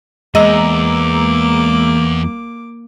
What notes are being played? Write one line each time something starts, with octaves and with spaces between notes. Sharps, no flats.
E2 G#3 A#3 D#5 A#5 D6 E6